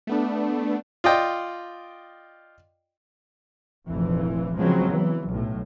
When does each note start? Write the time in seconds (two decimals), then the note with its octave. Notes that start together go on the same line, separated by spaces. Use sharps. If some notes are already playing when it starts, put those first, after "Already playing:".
0.07 A3 B3 D4
1.04 F4 D5 D#5 G5
3.88 F1 A#1 F2 E3
4.58 C#3 F3 F#3 G#3 B3 C4
4.91 E3
5.30 B1 A2